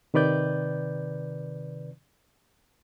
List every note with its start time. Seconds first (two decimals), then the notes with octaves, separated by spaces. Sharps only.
0.14 C3 D#3 B4 D5 G6